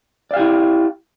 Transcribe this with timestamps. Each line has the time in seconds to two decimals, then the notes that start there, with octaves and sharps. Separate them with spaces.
0.31 D5
0.34 F5
0.36 G4
0.39 E4